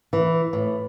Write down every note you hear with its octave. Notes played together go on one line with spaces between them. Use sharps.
E3
A2